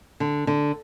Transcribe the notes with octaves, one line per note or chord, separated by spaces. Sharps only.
D3
D3